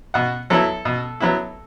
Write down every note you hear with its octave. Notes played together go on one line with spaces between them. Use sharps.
B2 F#5
F#3 B3 E4 A4
B2
F#3 B3 E4